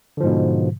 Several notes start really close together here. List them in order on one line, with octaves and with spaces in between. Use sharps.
D3 F3 G#2 B2